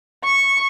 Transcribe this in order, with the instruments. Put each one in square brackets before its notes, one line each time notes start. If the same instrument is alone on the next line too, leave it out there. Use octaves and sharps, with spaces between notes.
[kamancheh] C#6